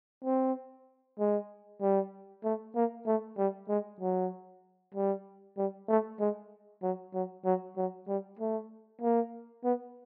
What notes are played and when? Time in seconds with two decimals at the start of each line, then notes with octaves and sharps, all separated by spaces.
0.25 C4
1.19 G#3
1.81 G3
2.44 A3
2.75 A#3
3.06 A3
3.38 G3
3.69 G#3
4.00 F#3
4.94 G3
5.57 G3
5.88 A3
6.20 G#3
6.82 F#3
7.14 F#3
7.45 F#3
7.77 F#3
8.08 G3
8.39 A3
9.01 A#3
9.64 B3